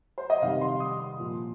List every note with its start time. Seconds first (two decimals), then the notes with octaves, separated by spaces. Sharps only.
0.18 C5
0.30 D#5
0.42 C3 D#3 G3 F5
0.61 C6
0.80 D#6
1.00 C6
1.19 A#2 F3